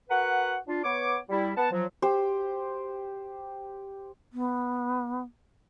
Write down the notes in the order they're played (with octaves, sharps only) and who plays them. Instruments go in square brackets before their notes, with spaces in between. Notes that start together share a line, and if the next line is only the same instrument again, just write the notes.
[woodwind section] F#4 A#4 B4 F#5
D4 F4
B3 C#5 D6
G3 E4
B3 F#5 A5
F3 F#3
[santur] G4 C5
[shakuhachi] B3